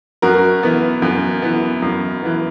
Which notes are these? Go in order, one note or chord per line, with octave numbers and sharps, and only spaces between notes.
F#2 F#4 A#4
E3 B3
F#2
E3 B3
F#2
E3 B3